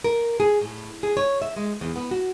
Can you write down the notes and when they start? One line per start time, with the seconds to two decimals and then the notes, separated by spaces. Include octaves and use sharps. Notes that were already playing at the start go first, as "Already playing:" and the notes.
0.04 A#4
0.40 G#4
0.61 A2
1.03 G#4
1.17 C#5
1.42 E5
1.56 G#3
1.81 E2
1.96 B3
2.11 F#4